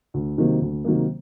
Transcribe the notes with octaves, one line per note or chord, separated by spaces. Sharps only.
D2
C3 D#3 F#3 A#3
D2
C3 D#3 F#3 A#3